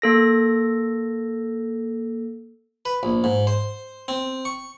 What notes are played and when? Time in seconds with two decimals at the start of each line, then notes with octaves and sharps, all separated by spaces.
0.02 A#3 A4 A#6
2.85 B4
3.03 A#1
3.24 G#2
3.47 C5
4.08 C4
4.45 C#6